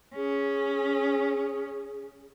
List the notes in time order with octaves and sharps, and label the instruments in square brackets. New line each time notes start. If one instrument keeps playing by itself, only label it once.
[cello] C#4 [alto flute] G#4